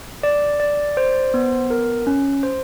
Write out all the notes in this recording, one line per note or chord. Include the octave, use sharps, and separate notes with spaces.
D5
D5
C5
B3
A#4
C#4
C5